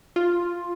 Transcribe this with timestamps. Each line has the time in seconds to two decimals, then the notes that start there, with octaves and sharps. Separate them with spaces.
0.16 F4